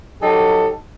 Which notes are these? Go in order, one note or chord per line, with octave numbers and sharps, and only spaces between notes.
F#3 D#4 G4 A4